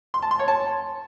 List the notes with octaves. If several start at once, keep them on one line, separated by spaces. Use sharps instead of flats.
C6
A5
C6
C#5
A5